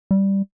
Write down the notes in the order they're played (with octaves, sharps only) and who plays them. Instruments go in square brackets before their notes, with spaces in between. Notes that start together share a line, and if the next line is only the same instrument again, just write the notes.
[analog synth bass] G3